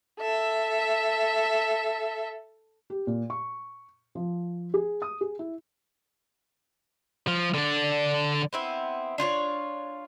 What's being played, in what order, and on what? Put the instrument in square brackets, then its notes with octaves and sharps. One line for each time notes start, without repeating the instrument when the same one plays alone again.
[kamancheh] A4 E5
[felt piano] G4
A#2
C#6
F3
G#4
D#6
G#4
E4
[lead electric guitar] F3
D3 D4
[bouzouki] B3 C4 E4
D4 F4 C5 C#5